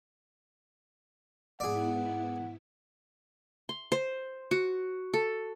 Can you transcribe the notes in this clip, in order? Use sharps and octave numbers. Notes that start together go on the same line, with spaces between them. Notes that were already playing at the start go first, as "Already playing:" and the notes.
G#2 B3 E4 G#4 D5 F#5
C6
C5
F#4
A4